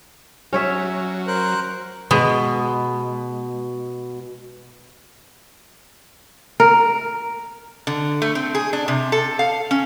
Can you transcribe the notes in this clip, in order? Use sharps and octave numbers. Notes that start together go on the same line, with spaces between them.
F#3 C#4 C#5 E5
A#4 C5 F#6
B2 G#3
A#4
D3
A3
C4
G#4
D4
C3
A4
F5
C#4